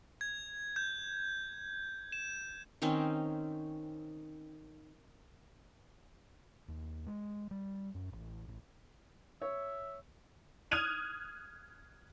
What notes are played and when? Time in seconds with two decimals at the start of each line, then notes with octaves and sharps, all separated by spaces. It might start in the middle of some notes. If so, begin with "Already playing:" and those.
0.21 G#6
0.76 G6
2.12 E7
2.82 D#3 C4 C#4 D#4
6.68 D#2
7.06 G#3
7.51 G3
7.95 F#2
8.13 A1
8.48 A1
9.42 C#5 E5
10.71 D#6 F6 F#6 G#6 D#7 F7